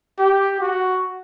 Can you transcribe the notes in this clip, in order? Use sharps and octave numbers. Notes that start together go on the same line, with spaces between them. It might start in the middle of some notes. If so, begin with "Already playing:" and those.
G4
F#4